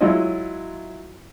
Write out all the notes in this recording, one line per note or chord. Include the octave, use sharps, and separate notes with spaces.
F#3 G#3 E4 F4 C#5 D#5